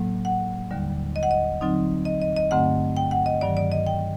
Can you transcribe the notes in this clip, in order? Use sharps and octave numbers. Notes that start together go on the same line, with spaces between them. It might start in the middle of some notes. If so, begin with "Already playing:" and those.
Already playing: A2 F#3 A#3
F#5
D#2 D3 G3
D#5
F#5
D#5
D3 F#3 C4 D#4
D#5
D#5
D#5
G2 D3 A3 C4 F#5
G5
F#5
D#5
G2 D#3 F#3 D5
D5
D#5
G5